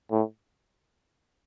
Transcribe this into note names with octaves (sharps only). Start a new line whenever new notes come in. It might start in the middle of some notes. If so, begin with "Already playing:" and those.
A2